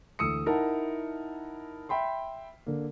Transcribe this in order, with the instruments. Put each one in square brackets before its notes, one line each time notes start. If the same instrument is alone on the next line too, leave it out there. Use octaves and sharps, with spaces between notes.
[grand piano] D2 E3 D#6 E6 C#7
D#4 E4 A#4 F#5 A5
E5 G5 B5 C6
D3 A#3